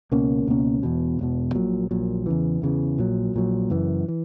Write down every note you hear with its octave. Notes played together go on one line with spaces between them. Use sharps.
C#2 B2 A#3 C#4
C#2 B2 A#3 C#4
E1 E2 B2
E1 E2 B2
A#1 A#2 F#3
A#1 A#2 F#3
E2 C#3 E3
E2 C#3 E3
A#1 A#2 F#3
A#1 A#2 F#3
F#1 F#2 E3
E3